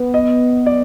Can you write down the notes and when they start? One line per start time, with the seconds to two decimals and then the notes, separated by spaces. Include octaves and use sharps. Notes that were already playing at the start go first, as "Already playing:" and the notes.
Already playing: B3
0.14 D#5
0.66 D5